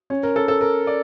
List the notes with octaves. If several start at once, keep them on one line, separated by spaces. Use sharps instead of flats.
C#4
A#4
A4
A4
A#4
D5